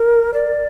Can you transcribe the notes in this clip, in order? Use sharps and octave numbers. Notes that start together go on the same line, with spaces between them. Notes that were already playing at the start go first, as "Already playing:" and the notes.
Already playing: A#4
D5